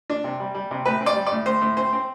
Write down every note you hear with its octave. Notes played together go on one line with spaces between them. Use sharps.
D4
C3
G3
G3
C3
A2 B4
C4
D5
G3
D5
A2
A2 C5
A2
C4 C5
C4